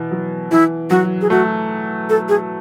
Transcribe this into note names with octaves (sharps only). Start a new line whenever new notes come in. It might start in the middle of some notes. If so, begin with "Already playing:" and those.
Already playing: B2 E3
F#3
E3 E4
F#3 F#4
G#4
A3 F#4
A4
G#4